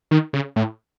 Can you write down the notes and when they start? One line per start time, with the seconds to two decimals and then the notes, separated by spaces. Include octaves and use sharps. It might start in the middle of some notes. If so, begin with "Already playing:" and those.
0.11 D#3
0.33 C#3
0.56 A2